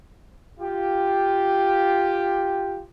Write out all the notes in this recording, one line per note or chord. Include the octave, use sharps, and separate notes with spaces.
F4 G4